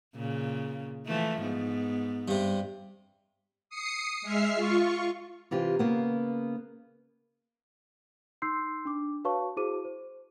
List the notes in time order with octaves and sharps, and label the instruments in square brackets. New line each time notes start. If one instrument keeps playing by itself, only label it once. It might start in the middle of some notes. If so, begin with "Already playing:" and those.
[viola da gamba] A#2 C#3
E3 F3 A3
G#2 B3
[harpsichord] G2 C3
[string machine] D#6 C7 C#7
G#3 E5 F6 C7
F4 C#6
[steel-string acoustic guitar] C3 E3 F4 G4
C#3 A#3 B3
[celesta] D#4 C6 E6 G6 C7
D4 D6
F#4 B4 C#5 F5 A5 C#6
E4 F#4 G#4 C5 D6 D#7
C5